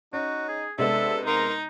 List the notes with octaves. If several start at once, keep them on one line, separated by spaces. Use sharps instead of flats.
C#4 D#4 F#4
G#4
C3 G#3 B3 D4 A4 E5
D#4 A#4 C6